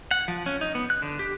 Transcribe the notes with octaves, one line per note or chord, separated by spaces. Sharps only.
F#5
F3
C#4
D#4
B3
F#6
D3
G4